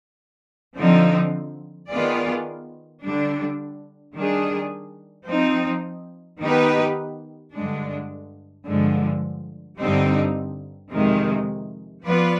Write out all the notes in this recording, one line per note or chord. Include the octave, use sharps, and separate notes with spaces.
D3 F3 C4 D#4
D#3 B3 F4 G#4 D5
D3 G3 D4
D#3 G3 D4 G#4
F3 C4 D#4
D#3 B3 D#4 G4 B4
G2 D3 G#3 D4
G2 D3 F3 G#3
G2 D3 G3 C4 D#4
F2 C3 D#3 G#3
F3 B3 F4 B4 D5